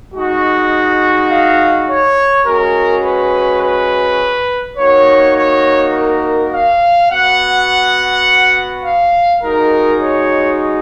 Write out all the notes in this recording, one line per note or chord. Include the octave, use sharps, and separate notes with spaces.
G#3 D#4 F#4
F5
C#5
G#3 C#4 F#4 A#4
B4
B4
A#3 D#4 F#4 C#5
C#5
A#4
F5
B3 F#4 F#5
F5
G#3 D#4 F#4 A#4
C#5